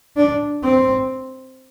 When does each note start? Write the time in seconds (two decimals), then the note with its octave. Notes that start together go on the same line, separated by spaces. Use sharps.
0.17 D4
0.63 C4